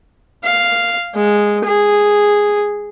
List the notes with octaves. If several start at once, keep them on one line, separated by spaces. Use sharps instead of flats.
F5
G#3
G#4